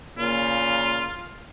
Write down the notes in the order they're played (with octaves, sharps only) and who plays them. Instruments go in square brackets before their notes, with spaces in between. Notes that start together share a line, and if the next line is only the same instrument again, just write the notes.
[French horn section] A#2 C#3 A#3 [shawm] F4